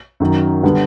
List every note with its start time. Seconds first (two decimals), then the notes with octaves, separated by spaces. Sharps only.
0.20 F#2 D#3 F#3
0.63 D3 G3 B3